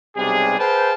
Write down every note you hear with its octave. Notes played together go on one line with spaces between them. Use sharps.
B1 C3 G3 D4 G#4
G#4 B4 C5 F5 G5 A5